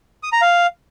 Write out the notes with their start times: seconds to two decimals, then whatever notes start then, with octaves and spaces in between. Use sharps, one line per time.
0.23 D#6
0.32 A#5
0.42 F5